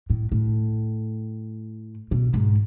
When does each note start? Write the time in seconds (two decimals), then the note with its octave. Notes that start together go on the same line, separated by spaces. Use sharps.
0.10 A2
0.32 A2
2.11 B2
2.34 G#2